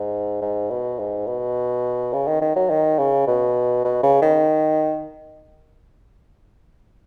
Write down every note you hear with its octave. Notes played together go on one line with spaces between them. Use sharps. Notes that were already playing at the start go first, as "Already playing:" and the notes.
Already playing: G#2
G#2
B2
G#2
B2
C#3
D#3
D#3
F#3
D#3
C#3
B2
B2
C#3
D#3